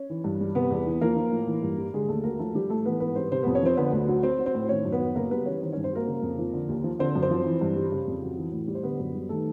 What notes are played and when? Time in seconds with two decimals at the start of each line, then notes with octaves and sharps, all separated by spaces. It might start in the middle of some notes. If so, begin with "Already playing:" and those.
Already playing: C#4 C#5
0.10 E3
0.24 G2
0.41 G3
0.55 C3 B3 B4
0.70 E2
0.87 E3
1.01 F3 A#3 A#4
1.17 F3
1.32 A2
1.47 E3
1.62 G2
1.78 G3
1.94 D3 G#3 G#4
2.08 D#2 A3 A4
2.24 F#3 A#3 A#4
2.39 F3 A3 A4
2.55 F3 G3 G4
2.70 A2 A3 A4
2.86 E3 B3 B4
3.00 G#2 B3 B4
3.16 G3 C4 C5
3.32 C3 C4 C5
3.43 F2 B3 B4
3.55 C#4 C#5
3.62 F3 C4 C5
3.77 D3 B3 B4
3.93 D2
4.09 F#3
4.23 F#3 C4 C5
4.39 F#3
4.46 C4 C5
4.55 A2
4.69 D#3 C#4 C#5
4.85 F#2
4.92 B3 B4
5.00 F#3
5.15 C#3 A#3 A#4
5.31 G3 B3 B4
5.46 E3 C#4 C#5
5.61 D#3 C4 C5
5.72 G2 C#4 C#5
5.84 C4 C5
5.93 F#3 A#3 A#4
6.07 C#3
6.23 F2
6.39 F3
6.53 D3
6.69 D#2
6.84 F3
6.99 D3 C4 C5
7.15 F#2
7.22 C4 C5
7.31 F3
7.46 E3
7.61 G2
7.76 G3
7.92 C#3
8.07 F2
8.22 F#3
8.38 E3
8.52 A2
8.68 G3
8.75 C5
8.83 D3 B3 B4
8.99 F#2
9.15 G3
9.29 D#3 A3 A4